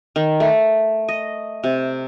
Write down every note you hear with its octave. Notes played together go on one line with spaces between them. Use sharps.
D#3
A3
D#5
C3